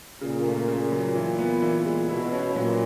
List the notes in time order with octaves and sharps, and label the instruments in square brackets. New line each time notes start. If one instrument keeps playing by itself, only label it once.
[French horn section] A#2 [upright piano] C#3
[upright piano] A3
C#3
F#3
E3
B3
E3
G#3
[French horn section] B2 [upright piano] E4
[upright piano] C#4
[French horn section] A#2 [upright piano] F#3